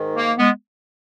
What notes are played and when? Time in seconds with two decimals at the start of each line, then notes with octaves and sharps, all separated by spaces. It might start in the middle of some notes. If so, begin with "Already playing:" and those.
Already playing: G#2 D#3
0.16 A#3
0.38 G#3 B3